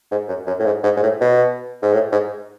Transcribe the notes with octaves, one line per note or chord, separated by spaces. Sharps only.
G#2
F#2
F#2
A2
G#2
G#2
G#2
A2
B2
G#2
A2
G#2